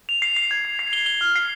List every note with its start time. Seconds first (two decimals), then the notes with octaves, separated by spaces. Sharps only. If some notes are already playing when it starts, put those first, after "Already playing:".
0.09 F7
0.22 C7
0.37 C7
0.51 G#6
0.65 C7
0.79 C7
0.93 G7
1.06 G7
1.21 F6
1.36 C7